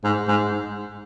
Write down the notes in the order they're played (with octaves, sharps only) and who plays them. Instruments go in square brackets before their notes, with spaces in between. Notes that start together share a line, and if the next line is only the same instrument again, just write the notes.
[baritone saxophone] G#2
G#2